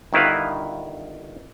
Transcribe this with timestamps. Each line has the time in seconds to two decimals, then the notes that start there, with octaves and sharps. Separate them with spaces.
0.13 G1 D#3 E4 B4 F5